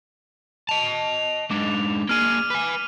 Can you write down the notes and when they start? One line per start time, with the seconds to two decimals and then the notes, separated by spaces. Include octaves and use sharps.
0.69 D#5 A5 F7
1.51 G#2 D4 D6
2.09 A#3 G#4 F6 D#7
2.50 B4 G#5